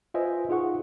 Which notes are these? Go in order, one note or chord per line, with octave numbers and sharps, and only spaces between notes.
F4 B4 C5 D#5 E5 G#5
D#4 F4 G#4 F#5 C#6